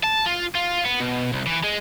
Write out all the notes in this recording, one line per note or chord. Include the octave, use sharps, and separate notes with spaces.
A5
F4
F4
B3
B2
C2
E3
G#3